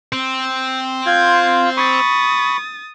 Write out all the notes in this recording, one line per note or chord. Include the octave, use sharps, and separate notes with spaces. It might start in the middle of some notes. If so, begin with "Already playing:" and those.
C4
F4 G6 G#6
B5 C#6 D#6 A6